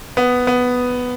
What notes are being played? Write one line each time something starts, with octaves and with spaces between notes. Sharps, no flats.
B3
B3